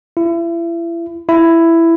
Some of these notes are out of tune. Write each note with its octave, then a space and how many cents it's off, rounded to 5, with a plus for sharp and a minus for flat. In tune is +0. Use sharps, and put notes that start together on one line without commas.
E4 +35
E4 +10